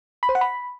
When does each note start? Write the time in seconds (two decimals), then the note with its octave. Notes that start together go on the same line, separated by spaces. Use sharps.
0.23 B5
0.29 C5
0.35 F#5
0.41 B5